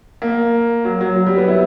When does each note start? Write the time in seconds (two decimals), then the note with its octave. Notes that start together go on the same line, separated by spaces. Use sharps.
0.22 A#3
0.85 F#3
1.01 F#3
1.16 F#3
1.26 G3
1.38 B3
1.48 E4